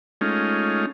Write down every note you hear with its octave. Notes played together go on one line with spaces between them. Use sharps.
G#3 A3 C#4 D#4 F4